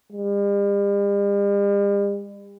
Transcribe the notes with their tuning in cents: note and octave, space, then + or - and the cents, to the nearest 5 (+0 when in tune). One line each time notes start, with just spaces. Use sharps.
G3 +45